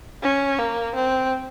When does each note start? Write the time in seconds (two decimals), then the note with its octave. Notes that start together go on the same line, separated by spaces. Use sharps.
0.22 C#4
0.59 A#3
0.95 C4